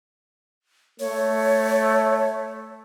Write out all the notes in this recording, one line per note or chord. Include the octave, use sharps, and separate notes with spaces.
A3 C#5